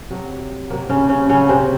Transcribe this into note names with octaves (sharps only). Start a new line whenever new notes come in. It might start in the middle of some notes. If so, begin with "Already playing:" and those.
C3 F#3
C3 F#3 A#3
C#3 C#4
C#3 C#4
A#2 C#3 F#3 C#4
C3 C4